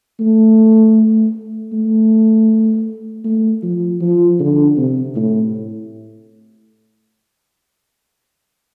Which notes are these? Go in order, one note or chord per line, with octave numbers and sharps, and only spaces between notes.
A3
A3
A3
F3
F3
D3
C3
A2